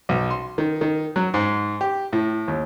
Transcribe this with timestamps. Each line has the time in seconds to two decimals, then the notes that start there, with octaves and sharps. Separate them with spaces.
0.09 B1
0.31 C6
0.58 D#3
0.81 D#3
1.16 F#3
1.34 G#2
1.81 G4
2.13 A2
2.48 D#2